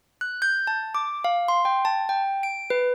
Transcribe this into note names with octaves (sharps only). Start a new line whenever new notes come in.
F#6
G6
A5
D6
F5
C6
G5
A5
G5
D7
B4